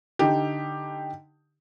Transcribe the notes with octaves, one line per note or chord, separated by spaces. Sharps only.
D3 D#4 G4